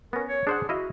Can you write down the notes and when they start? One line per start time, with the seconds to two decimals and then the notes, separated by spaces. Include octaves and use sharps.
0.13 B3 C#4 A#4
0.29 C#5
0.47 D4 G#4 C5 F#5
0.69 E4 F#4 D#5 F5